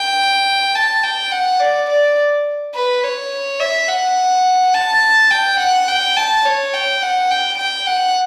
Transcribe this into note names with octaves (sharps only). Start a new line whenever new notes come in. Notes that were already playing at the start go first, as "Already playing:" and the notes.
Already playing: G5
A5
G5
F#5
D5
D5
B4
C#5
E5
F#5
A5
G5
F#5
G5
A5
C#5
G5
F#5
G5
G5
F#5